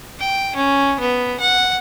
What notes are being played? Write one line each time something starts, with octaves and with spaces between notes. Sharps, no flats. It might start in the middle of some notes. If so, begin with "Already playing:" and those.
G5
C#4
B3
F#5